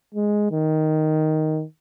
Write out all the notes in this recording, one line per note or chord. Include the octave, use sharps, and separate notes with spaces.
G#3
D#3